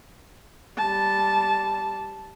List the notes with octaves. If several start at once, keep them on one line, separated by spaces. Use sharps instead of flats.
G3 A5